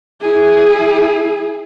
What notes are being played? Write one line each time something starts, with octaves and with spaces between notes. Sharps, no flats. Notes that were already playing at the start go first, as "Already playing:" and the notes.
E4 G#4